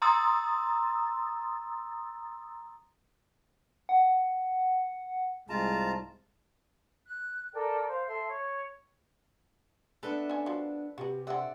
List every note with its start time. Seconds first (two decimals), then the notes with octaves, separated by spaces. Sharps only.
0.02 A#5 C6 D#6 E6 A6
3.89 F#5
5.49 C2 G#2 G#3 F4 A5 A#5
7.05 F#6
7.53 A4 A#4 D5 G5
7.88 C5 F5
8.06 A4 E5 C6
8.27 C#5
10.03 B3 D4 A4 B4 E5
10.29 C#4 G#5
10.46 F3 F#4
10.98 C3 F#4 G4 B4
11.27 D3 C4 D5 E5 F#5